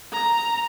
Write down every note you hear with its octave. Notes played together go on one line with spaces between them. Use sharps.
A#5